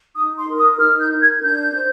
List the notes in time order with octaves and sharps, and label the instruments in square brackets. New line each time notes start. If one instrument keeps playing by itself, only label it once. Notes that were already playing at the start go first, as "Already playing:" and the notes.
[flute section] D#4 D#6
C6
A#4
D#6
D#4 F6
G6
A#4
G#6
D4 G6
C5